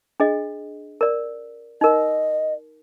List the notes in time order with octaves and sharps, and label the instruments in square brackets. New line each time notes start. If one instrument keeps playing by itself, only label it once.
[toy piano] D4 G#4 D#5
A#4 D5
[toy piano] D#4 A#4 [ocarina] D#5